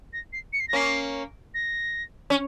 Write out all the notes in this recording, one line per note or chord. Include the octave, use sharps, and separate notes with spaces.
A#6
C7
C#7
C7
A#6
A#3 C#4 C7
A#6
C#4